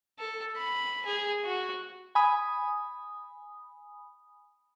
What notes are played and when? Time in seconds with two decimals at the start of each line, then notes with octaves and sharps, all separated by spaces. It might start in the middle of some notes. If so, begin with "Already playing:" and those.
0.19 A4
0.57 B5
1.06 G#4
1.44 F#4
2.15 G#5 B5 D#6